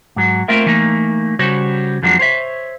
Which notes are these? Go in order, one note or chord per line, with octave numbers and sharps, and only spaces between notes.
G#2 F#3
A3 A#3 C4 F4 A#4 E5
E3 A3 A#3 D#4
C#3 G3 F#4 C5 C#5
F2 F3 F#3 G#3 D4
C5 C#5 E5